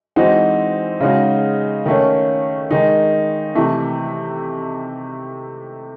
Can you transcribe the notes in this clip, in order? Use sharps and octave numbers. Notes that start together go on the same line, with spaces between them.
E3 G#3 C4 D#4 F#4
C#3 G#3 D#4 F#4
D#3 A3 C#4
D#3 G#3 D#4
C3 E3 A3